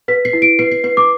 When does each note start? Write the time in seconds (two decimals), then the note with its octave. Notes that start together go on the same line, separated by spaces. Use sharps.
0.08 B4 B6
0.25 C7
0.33 E4
0.42 D7
0.59 B4 C7
0.71 C7
0.84 B4 C7
0.97 D6